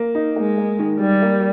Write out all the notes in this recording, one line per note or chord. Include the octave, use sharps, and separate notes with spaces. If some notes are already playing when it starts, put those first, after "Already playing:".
Already playing: A#3
D#4
G#3 A#3
A#3
D#3
D#3 G3
A#3